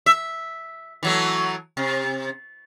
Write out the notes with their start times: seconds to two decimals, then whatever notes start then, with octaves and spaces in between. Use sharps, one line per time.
0.06 E5
1.03 E3 F#3 A3
1.77 C3